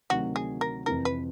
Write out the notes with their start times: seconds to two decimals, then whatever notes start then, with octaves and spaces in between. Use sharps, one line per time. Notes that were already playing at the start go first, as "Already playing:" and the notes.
0.10 D2 C3 D#3 F#3 F#4
0.36 G#4
0.61 A#4
0.86 F2 C3 E3 A#4
1.05 B4